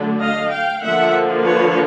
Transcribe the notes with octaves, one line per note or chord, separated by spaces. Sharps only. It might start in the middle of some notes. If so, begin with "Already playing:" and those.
Already playing: D3 F#3 A3 D4
D#5 F5
F5 G5
D3 F3 A#3 E5 F#5
B4 C#5